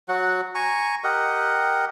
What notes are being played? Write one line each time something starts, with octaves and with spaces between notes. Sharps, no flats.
F#3 F#4 F#5
G#5 A#5 C#6
G4 A#4 D#5 F#5